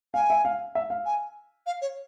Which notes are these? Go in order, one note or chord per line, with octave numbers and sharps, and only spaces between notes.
F5 G#5
E5
F5
E5
F5
G#5
F5
C#5